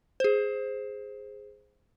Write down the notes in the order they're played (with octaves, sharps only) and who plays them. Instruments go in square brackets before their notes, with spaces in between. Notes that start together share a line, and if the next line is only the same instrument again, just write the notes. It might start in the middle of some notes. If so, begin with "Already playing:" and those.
[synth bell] G#4 C5